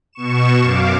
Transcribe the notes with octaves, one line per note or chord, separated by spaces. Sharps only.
B2 C#6 E7
F#2 F5 D6